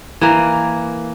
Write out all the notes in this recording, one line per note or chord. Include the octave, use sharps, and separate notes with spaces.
E3 A#3